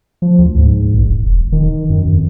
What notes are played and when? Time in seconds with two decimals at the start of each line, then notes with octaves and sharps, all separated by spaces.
0.22 F3
0.39 D2
0.57 G#2
0.94 A#1
1.06 D#1
1.26 E1
1.52 D#3
1.89 F#2
2.13 F2